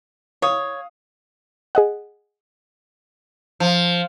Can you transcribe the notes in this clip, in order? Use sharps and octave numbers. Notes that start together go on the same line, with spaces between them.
C#5 F5 D#6
G#4 D#5 F#5
F3